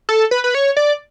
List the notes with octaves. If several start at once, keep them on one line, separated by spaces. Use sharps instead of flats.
A4
B4
B4
C#5
D5